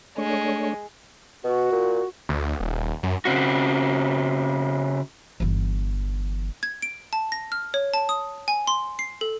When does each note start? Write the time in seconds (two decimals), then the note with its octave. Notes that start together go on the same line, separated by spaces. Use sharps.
0.18 G#3 A3 D4 C#5
1.44 B2 F#4
1.72 A#2
2.29 D2
2.60 D#1
3.03 F#2
3.25 C#3 C4 F#4
5.40 G1 E3
6.63 G#6
6.82 D7
7.13 A5
7.32 A#6
7.52 F6
7.74 C#5
7.94 A5
8.09 D#6
8.48 G#5
8.67 C6
8.99 C7
9.21 A4